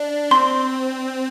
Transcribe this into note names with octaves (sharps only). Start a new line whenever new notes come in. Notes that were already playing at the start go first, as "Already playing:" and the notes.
Already playing: D4 D5
C4 C6